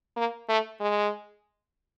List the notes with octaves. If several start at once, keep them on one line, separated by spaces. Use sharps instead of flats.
A#3
A3
G#3